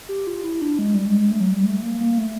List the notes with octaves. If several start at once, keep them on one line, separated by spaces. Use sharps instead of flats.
G4
F4
E4
D4
G#3
G3
G#3
A3
F#3
G3
A3
A#3
A#3
A3